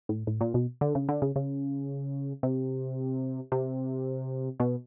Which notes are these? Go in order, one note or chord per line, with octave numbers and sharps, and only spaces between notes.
A2
A2
A#2
B2
D3
C#3
D3
C#3
C#3
C3
C3
B2